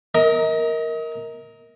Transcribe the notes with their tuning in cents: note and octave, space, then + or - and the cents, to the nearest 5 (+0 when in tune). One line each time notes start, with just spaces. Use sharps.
A#4 +0 D#5 +35